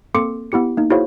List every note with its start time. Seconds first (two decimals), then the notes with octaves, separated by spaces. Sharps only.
0.15 A#3 C4 A4 C6 D6 C#7
0.52 B3 E4 G4 C#7
0.77 A#3 D#4
0.90 E4 F#4 G#4 C5 C#5 F5